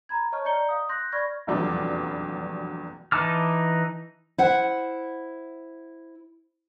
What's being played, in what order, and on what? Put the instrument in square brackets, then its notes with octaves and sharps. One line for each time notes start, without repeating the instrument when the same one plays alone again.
[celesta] A#5 B5 G#6
C#5 D#5 A5 C#6 F6
D5 D#5 A#5 G6 C#7 G7
F5 D#6
C6 F#6 G6 A#6
D5 B5 C#6 F6 G#6 A#6
[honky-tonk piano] F1 A#1 E2 F#3 G3 D4
[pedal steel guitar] E3 D#4 A5 D6 F6
[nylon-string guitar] E4 C5 F#5